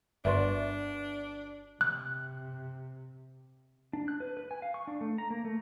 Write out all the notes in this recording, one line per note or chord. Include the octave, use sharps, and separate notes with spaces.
G1 D4 F#4 B4 D5 E5 C6
C3 F#6
D4
F#6
B4
B4
G#5
F5
C#6
D4
A3
A#5
A#3
A3